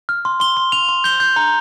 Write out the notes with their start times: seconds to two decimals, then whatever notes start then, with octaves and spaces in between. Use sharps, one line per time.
0.09 F6
0.25 C6
0.40 C6 G7
0.57 C6
0.72 C6 F7
0.89 C6
1.04 G6 G7
1.20 G6
1.36 A#5